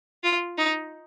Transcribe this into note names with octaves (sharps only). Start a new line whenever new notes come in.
F4
D#4